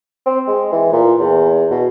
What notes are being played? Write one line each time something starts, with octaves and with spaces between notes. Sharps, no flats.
C4
G#3
E3
A#2
E2
B2